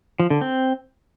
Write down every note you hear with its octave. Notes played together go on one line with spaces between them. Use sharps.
F3
D3
C4